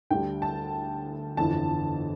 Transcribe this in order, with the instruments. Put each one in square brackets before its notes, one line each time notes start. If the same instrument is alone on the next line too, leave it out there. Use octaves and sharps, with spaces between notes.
[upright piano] D2 D3 G3 D4 G5
A5
G1 F2 E3 A5